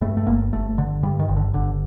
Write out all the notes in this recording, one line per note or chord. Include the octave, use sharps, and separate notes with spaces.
G2 A3
A3
G1 A#3
G1 A3
D3
G2 G3
D#3
G1
D3
G1 D3